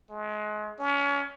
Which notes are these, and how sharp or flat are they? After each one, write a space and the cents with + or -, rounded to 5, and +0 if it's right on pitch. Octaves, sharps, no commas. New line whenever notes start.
G#3 +35
C#4 +30